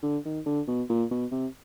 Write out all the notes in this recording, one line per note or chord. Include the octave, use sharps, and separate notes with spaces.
D3
D#3
D3
B2
A#2
B2
C3